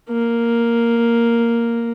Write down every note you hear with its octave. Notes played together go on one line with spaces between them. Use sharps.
A#3